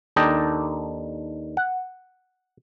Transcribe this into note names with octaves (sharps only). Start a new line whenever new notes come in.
D#2 D4 D#4 A4 D#5 G5
F#5